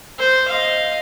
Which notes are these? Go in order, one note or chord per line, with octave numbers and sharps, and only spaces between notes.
C5
D#5 F5